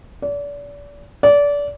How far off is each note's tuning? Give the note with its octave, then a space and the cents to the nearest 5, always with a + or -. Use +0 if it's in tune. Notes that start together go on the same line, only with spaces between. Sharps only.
D5 -35
D5 -25